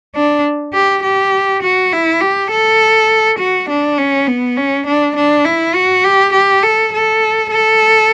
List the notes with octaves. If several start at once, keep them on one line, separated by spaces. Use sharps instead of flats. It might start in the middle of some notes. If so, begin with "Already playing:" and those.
D4
G4
G4
F#4
E4
G4
A4
F#4
D4
C#4
B3
C#4
D4
D4
E4
F#4
G4
G4
A4
A4
A4